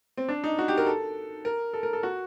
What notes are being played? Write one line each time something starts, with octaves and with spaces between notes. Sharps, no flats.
C4
D4
D#4
F#4
G4
A#4
A4
A#4
A4
A#4
A4
F#4